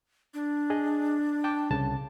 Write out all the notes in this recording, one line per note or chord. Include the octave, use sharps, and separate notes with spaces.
D4
G#4 D#5
G5 A5 D6
C2 C#3 A5